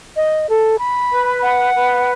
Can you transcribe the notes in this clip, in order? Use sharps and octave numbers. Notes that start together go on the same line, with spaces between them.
D#5
A4
B5
B4
F#5
B4